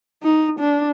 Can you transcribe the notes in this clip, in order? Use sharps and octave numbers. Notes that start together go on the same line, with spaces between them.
D#4
D4